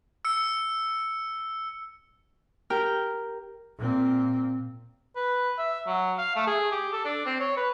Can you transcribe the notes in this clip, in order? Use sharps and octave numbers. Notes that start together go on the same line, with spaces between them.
E6 C#7
G4 A#4 G5 F6
A#2 C4
B4
E5
F#3
F5
A3
G#4
G4
A4
D4
C4
C#5
B4